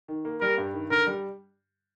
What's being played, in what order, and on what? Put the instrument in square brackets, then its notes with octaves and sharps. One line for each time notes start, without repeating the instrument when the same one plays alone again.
[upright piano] D#3
A#3
[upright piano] G3 [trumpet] A#4
[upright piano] G2
D#3
[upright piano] D3 [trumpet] A#4
[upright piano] G3